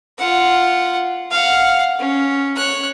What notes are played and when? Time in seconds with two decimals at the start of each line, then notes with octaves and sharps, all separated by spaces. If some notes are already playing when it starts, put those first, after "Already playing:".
0.18 F4 F#5
1.31 F5 F#5
1.99 C#4
2.56 C#5 F#6